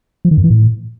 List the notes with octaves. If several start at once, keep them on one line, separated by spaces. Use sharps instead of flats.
F3
D#3
F#2
E3
A2